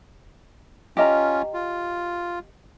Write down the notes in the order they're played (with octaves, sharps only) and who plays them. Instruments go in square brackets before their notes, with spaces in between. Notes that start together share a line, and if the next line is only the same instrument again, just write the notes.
[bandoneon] C#4 F4 [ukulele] G4 D#5 A#5
[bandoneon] F4